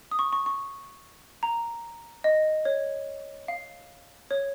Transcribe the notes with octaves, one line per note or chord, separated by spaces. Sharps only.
D#6
C#6
C#6
C#6
A#5
D#5
C#5
F5
C#5